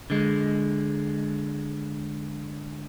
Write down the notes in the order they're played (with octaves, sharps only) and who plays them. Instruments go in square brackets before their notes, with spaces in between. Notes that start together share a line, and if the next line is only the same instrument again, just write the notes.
[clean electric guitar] D3 G#3